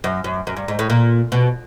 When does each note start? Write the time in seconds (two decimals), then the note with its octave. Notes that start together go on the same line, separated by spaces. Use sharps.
0.04 F#2
0.24 F#2
0.47 F#2
0.56 G2
0.68 G#2
0.79 A2
0.90 A#2
1.32 B2